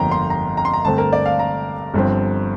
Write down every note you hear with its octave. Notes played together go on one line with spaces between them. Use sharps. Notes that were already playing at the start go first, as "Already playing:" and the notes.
Already playing: G1 F2 D3 F3 A#3 G5 A#5
C6
A#5
A#5
C6
A#5
G2 D3 A3 C4 A5
A#4
D5
F5
A#5
G1 G2 F3 C4